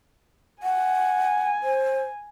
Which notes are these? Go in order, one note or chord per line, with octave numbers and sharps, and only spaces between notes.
F#5 G#5
C5